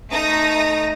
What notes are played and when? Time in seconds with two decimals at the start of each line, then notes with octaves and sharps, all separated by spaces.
0.10 A3 D#4 A#5 D#6 A#6